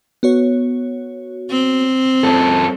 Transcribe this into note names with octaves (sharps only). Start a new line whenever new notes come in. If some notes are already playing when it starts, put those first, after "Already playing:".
B3 F#4 C#5
C4
F#2 A4